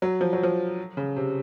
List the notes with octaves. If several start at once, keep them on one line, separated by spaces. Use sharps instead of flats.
F#3
F3
F#3
F3
C#3
C3